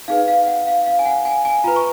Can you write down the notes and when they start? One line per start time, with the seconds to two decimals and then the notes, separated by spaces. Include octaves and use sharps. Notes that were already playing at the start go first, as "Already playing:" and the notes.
0.08 D#4 G#4 B4 F5
0.28 F5
0.47 F#5
0.67 F5
0.86 F5
0.99 G#5
1.06 F#5
1.25 G#5
1.45 G#5
1.64 F4 A#5
1.68 B4
1.76 C#6